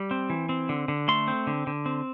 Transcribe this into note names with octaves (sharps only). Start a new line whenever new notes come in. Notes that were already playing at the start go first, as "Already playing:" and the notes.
Already playing: G3
C4
E3
C4
D3
D3
A3 C6
C4
D3
D3
C4